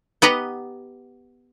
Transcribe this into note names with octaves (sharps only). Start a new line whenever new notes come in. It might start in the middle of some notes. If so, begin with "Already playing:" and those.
B3 G4 B4 D#5 F#5 A#5